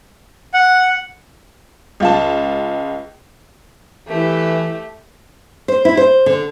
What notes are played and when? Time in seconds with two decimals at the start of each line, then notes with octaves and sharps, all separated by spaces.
0.54 F#5
2.00 C#2 F4 A5
4.08 E3 A3 G4
5.68 C5
5.85 E4
5.97 C5
6.26 D3